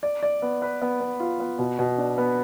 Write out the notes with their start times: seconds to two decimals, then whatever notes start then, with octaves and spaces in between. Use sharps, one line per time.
0.03 D5
0.23 D5
0.42 B3
0.62 B4
0.82 B3
1.00 B3
1.20 F4
1.40 B3
1.59 B2
1.79 B2
1.98 D4
2.18 B3